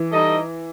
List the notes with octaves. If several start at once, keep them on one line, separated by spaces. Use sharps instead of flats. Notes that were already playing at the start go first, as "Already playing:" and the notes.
Already playing: E3
G3 D#4 A4 D#5